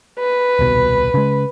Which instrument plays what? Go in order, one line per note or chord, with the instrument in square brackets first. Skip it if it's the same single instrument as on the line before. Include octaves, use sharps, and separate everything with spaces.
[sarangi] B4
[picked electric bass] D#1 C2 B2
C#3 G#3